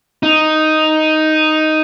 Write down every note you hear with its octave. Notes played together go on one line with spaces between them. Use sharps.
D#4